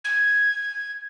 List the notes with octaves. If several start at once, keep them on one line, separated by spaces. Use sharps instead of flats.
G#6